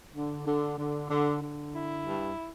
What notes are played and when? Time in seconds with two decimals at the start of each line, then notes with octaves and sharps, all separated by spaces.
0.15 D3
0.47 D3
0.78 D3
1.10 D3
1.42 D3
1.73 E4
2.05 G2